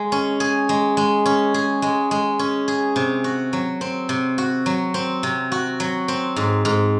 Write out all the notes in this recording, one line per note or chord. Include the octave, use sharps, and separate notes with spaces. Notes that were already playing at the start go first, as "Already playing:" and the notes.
Already playing: G#3
C#4
G#4
G#3
G#3
C#4
G#4
G#3
G#3
C#4
G#4
C3
F#4
F#3
C4
C3
F#4
F#3
C4
C3
F#4
F#3
C4
G#2
G#2